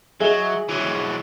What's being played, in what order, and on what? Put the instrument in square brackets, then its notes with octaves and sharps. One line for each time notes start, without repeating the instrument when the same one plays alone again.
[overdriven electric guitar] F#3 [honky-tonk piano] G#4 D#5 E5
[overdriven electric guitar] E3 F#3